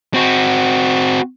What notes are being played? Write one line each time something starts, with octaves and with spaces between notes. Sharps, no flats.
C4 F#4